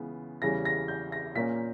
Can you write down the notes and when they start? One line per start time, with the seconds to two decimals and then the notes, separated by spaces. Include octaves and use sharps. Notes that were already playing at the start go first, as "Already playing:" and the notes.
Already playing: C#2 C#3 E3 B3
0.42 E2 C#3 E3 G3 C#4 A#6
0.65 A#6
0.88 G6
1.12 A#6
1.35 A#2 A#3 C#4 B6